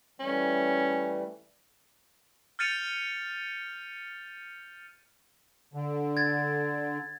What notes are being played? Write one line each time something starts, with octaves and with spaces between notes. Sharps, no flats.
E3 G3 A3 C#4
F6 G6 A6 C#7 D#7 F7
D3
G#6 A6